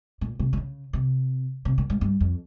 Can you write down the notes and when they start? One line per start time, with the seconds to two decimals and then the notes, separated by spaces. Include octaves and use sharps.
0.21 A#2
0.39 C3
0.53 C3
0.57 C#3
0.93 C3
1.65 C3
1.78 A#2
1.90 G#2
2.01 G2
2.20 F2